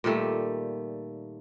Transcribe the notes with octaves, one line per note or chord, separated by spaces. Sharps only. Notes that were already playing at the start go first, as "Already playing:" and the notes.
A#2 D#3 G3 A3